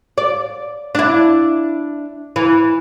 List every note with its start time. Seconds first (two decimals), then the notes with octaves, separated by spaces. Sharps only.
0.18 D5
0.95 D4 E4
2.36 E3